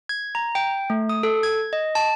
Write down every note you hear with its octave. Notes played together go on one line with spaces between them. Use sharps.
G#6
A#5
G5
A3
D#6
A4
G#6
D#5
A5